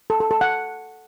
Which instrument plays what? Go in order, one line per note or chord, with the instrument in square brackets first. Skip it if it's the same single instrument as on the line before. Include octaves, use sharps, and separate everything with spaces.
[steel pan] A4
A4
A4
F#5